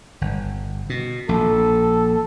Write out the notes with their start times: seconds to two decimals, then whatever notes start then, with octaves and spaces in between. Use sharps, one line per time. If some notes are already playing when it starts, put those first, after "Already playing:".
0.21 G1
0.90 B2
1.29 A#1 A4